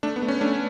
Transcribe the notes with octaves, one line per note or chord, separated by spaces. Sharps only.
A3 D4
B3
A3
C#4
A3 D4